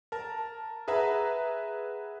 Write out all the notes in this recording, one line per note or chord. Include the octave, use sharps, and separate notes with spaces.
A#4 A5
G#4 B4 E5 F#5 A#5